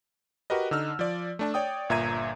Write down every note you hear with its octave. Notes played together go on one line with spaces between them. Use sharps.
F#4 G4 A#4 B4 D#5
D3 D#4 E6 F6
F3 D5
A3 D4 A5
C#5 D5 G5 D#6
G1 A#2 E5 A#5 G#6 D#7